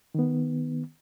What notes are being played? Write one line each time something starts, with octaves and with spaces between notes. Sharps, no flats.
D#3 B3